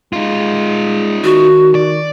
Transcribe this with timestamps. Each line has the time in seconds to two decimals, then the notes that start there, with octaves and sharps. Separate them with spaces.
0.13 G#3 D#4 F4
1.24 D#3 F#4
1.75 D5